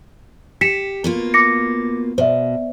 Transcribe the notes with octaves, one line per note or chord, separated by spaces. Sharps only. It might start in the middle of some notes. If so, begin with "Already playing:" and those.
G4 B6 C#7 E7
B2 A#3 F4
D6 A#6 C#7
B2 C5 D5 E5